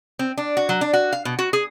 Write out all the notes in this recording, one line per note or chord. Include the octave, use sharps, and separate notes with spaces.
C4
D4
F#4
F#3
D4
F#4
F5
B2
F#4
G#4